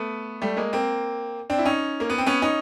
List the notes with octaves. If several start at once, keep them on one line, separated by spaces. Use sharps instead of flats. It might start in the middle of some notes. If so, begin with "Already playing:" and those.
Already playing: A3 B3
G3 A3
G#3 A#3
A#3 C4
C4 D4
E4
C#4 D#4
A#3
B3
C4
B3 C#4
C#4 D#4